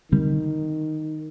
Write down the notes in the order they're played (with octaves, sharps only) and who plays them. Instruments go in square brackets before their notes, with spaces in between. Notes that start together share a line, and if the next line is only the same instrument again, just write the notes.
[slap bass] D3 G3 C4 [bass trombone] D#3